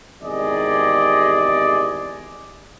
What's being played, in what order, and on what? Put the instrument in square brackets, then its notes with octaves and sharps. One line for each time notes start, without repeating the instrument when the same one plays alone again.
[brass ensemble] G#1 E2 C3 G#4 D5 D#5